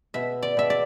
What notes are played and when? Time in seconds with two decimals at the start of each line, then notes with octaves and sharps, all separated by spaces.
0.14 B2 E5
0.43 D5
0.57 B2 E5
0.70 D5